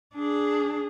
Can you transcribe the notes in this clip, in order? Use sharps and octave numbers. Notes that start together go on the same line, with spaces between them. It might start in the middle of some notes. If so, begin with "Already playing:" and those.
D4 G#4